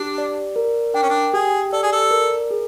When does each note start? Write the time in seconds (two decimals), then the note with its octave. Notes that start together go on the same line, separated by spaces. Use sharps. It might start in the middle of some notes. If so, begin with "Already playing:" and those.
Already playing: D4 G4
0.18 D5
0.56 A#4
0.94 D4 G5
1.02 C#4
1.10 D4
1.34 G4 G#4
1.72 A4 D5
1.83 G#4
1.93 A4
2.11 A#4
2.51 G#4